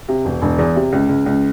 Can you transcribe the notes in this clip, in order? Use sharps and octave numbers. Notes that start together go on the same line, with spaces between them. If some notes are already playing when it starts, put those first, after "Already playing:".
C3
E1
E1
E2
C3
C#2
C#2
C#2